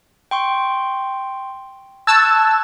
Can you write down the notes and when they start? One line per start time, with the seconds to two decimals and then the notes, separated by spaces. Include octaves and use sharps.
0.31 G5 C6 C#6
2.07 A5 C#6 E6 F#6 G#6